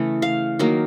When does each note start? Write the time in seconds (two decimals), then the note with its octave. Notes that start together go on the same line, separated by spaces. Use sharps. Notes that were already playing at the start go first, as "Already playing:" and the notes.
Already playing: C#3 E3 A3
0.22 F5
0.59 D#3 F#3 A#3